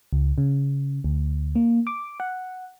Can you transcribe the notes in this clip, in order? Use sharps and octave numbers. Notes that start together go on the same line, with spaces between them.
C#2
C#3
D2
A#3
D6
F#5